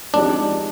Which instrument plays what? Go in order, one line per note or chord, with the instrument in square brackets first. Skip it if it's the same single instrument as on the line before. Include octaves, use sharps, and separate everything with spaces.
[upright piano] F3 G#3 C4 D#4 G4 [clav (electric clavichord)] D4